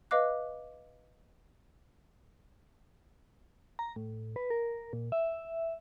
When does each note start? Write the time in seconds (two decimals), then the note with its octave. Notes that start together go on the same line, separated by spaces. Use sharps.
0.11 B4 D#5 F5 D6 F#6
3.79 A#5
3.96 A2
4.36 B4
4.50 A#4
4.93 A#2
5.12 E5